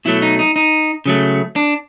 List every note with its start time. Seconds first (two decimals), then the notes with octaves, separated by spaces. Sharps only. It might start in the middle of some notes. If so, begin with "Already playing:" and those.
0.05 B2 F#3 A3 E4
0.22 D#4
0.39 D#4
0.56 D#4
1.06 C#3 F#3 A3
1.56 D4